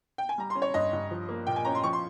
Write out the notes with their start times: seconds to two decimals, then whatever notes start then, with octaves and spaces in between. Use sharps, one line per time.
0.18 G5
0.29 G#5
0.38 G3 A#5
0.50 C6
0.55 C#4
0.62 C#5
0.74 G2 D#5
0.93 G2
1.11 F3
1.29 A#3
1.47 A#2 G5
1.56 G#5
1.65 C#4 A#5
1.75 C6
1.83 F3 C#6
1.93 C6